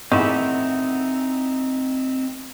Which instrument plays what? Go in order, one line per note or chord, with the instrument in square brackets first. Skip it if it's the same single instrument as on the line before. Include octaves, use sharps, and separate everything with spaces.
[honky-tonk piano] A1 G#4 F#5 [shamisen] D#3 E3 [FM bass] C4 [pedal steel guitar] D#4 E5